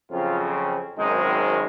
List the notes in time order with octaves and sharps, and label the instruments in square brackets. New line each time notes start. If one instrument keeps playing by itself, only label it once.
[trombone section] F2 C#3 F#3 C4 F4
G#1 F#2 D#3 G#3 C4 D#4